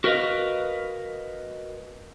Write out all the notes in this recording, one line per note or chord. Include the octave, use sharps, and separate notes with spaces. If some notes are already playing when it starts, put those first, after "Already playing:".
F#4 A#4 B4 D5 D#5 F5